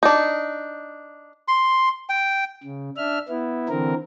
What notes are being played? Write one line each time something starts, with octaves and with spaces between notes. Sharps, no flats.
D4 D#4
C6
G5
C#3
D4 E5 F6
B3 E4
D3 E3 C4 A#4